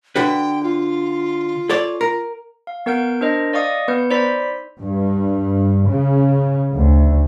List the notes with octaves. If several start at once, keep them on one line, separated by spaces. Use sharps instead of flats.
D3 F#4 B4 G5
F4
A4 C#5 D5
A#4
F5
B3 A#4 F#5 G6 D7
D4 A#4 C5 D#5
D5 D#5 F5 C#6 D#6
B3 B4 G6
D#4 C5 D5 B5 B6
G2
C#3
D2